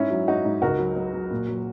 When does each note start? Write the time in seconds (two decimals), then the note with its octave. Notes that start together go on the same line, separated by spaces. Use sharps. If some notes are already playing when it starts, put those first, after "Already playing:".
Already playing: G#2 C#4 E4
0.10 F#3
0.28 G#2 D#4 F#4
0.45 G#2
0.62 C#2 F#4 A#4
0.79 F#3
0.96 F#3
1.13 F#3
1.31 A#2
1.48 F#3